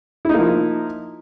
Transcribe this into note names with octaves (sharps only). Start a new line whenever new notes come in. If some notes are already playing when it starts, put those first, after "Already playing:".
F3 A#3 D#4 E4